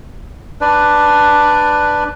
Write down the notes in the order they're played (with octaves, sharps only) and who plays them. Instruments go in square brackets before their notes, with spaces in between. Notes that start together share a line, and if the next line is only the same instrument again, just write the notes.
[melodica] D4 B4 D5